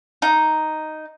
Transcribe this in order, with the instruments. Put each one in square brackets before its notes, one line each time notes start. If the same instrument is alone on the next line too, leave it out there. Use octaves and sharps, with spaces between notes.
[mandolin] D#4